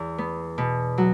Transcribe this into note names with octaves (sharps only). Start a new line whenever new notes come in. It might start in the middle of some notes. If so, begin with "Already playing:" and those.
Already playing: E2
B3
B2
F#3